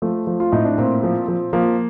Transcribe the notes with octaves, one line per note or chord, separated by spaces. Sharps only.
F3 A3
F3
F4
A2 D#4
D4
A#2 C4
F3
F3
F3 A#3